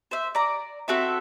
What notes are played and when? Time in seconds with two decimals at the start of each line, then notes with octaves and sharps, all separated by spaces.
0.11 C5 E5
0.35 D5 A#5
0.88 C4 F#4 A4 E5